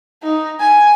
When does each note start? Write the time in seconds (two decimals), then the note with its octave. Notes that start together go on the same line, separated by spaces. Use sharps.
0.23 D#4
0.61 G#5